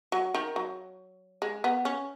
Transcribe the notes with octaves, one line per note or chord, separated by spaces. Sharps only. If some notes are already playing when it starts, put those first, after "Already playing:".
F#3
D#3
F#3
G#3
B3
C#4